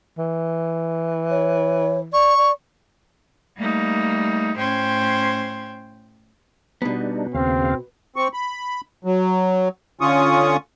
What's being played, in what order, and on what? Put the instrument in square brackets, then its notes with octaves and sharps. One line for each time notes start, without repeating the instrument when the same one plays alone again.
[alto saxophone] E3
[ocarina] C#5
[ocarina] D5 [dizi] C#6
[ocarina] D5
[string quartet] G3 A3 A#3 D#4
A2 C#4 C5 G5 C6 G#6
[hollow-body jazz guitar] B2 B3 [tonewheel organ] G3 D4 D#4
[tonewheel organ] D#2 C#3 F5 [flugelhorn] C4
[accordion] C4 C#6
B5
F#3
D3 C#4 F4 C#6 D#6